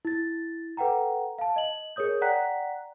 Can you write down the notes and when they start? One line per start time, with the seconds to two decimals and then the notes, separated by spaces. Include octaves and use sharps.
0.05 E4 A6
0.77 A4 B4 F#5 G5 A#5
1.39 F5 A5
1.56 D#5 F#7
1.96 G#4 A#4 C#5 D#6 G6
2.21 D5 F#5 G5 A#5 F#6 B6